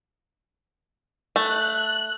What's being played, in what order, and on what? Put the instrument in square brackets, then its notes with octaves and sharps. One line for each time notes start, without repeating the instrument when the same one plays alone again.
[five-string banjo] A3 [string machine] F#6